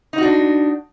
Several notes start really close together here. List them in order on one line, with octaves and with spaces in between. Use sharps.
D#4 F#4 D4